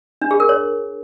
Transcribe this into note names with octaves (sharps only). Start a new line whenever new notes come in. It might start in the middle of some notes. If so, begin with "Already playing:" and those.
D4
G#4
A#4
C#5